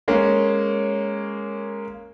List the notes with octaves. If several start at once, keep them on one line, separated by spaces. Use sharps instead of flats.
G#3 A#3 C#4 C#5